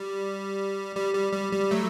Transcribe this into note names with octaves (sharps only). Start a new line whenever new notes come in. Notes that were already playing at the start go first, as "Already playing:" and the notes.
Already playing: G3
G3
G3
G3
G3
F#3 A3